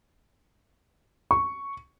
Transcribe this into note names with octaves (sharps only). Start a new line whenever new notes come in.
C#6